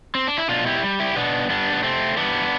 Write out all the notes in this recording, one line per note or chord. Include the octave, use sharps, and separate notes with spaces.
C4
D4
E4
B2 D4 F4
E4 G4
G3
E4 G4
B2 B3 D4
G3 B3 D4
B3
C3 A3 C4
E3 G3 B3 D4